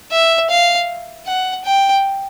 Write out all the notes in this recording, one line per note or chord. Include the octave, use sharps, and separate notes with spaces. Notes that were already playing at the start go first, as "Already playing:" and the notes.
E5
F5
F#5
G5